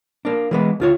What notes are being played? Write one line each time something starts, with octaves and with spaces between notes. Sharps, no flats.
A#3 D4
E3 G#3 B3
D2 F4 C#5